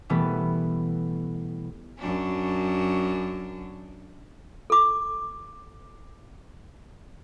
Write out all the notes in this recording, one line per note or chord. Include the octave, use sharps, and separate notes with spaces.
B2 E3 G3 A3 B3
F#2 D4
A4 D6